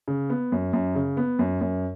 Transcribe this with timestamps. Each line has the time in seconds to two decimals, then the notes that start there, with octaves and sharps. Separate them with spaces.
0.08 C#3
0.30 B3
0.52 F#2
0.73 F#2
0.95 C#3
1.17 B3
1.39 F#2
1.61 F#2